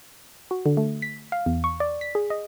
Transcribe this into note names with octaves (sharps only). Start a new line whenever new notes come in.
F#4
D3
A3
B6
F5
E2
C#6
D5
B6
G#4
D#5